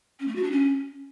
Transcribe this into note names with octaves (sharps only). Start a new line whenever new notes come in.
C#4
A3
F#4
D4
C#4